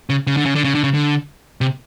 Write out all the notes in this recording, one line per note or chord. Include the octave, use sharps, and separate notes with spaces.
C#3
C#3
D3
C#3
D3
C#3
D3
C#3
D3
C3